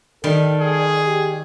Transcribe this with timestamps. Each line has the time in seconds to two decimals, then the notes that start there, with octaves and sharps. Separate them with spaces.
0.24 D#3 G3 A4
0.61 G#4
1.06 G4